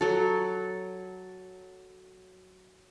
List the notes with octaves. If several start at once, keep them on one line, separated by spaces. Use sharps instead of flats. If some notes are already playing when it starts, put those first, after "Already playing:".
F#3 A4